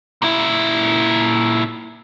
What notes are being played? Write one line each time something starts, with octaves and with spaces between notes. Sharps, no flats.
A#2 E4